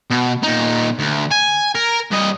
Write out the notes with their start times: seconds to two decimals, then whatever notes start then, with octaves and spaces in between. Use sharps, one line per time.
0.10 B2
0.43 A#2 D#4
0.99 D2
1.32 G#5
1.75 A#4
2.11 G2 D#5